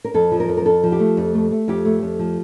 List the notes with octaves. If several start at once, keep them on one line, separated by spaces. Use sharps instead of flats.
A#4
F2 A4
F3
A#4
F2
A#4
F2 A4
F3
G4
A3
F2
A3
A3
F2 G4
A3
F2
F3